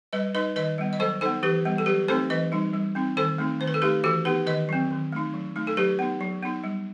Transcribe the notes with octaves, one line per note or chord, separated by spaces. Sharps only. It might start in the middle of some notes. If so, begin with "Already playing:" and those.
G3 B4 D#5
D#4 B4 D#5
D#3 B4 D#5
G3 B3
D#5
F#3 A4 C5
B3 D#4 A4 C5
E3 G4 B4
G3 B3
A4
F#3 G4 B4
A3 C4 D#4 A4 C5
E3 B4 D#5
G3 D#4
G3
C4 D#4
D#3 A4 C5
A3 C4 D#4
D#3 C5
B4
A4
A3 D#4 G4 B4
E3 F#4 A4
B3 D#4 G4 B4
D#3 B4 D#5
F#3 C4
D#3
A3 D#4
F#3
A3 D#4
A4
F#3 G4 B4
B3 D#4
F#3
B3 D#4
G3